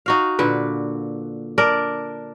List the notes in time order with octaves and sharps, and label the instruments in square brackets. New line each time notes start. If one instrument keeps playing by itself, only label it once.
[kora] D#4 F#4 F5
A#2 D3 B4
D4 A#4 D5